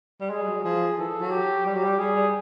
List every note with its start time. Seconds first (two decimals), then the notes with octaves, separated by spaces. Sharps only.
0.21 G3
0.30 G#3 G#4
0.42 G3
0.47 F#3
0.64 F3 G#4
0.98 E3 A4
1.21 F#3
1.31 G4
1.66 G3 G4
1.75 F#3
1.84 G3
1.99 G3 G#4
2.16 G3